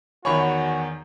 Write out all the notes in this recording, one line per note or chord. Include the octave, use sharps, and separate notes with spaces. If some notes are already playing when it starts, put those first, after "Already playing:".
E2 D#3 F#4 C#5 G#5 B5 C#6